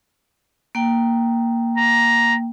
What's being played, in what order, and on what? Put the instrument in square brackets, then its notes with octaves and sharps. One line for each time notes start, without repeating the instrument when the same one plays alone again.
[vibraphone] A#3 G5
[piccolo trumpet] A#5